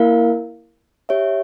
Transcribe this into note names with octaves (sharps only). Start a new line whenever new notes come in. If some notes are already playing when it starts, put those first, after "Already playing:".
Already playing: A#3 E4 A#4 F5
G4 C#5 E5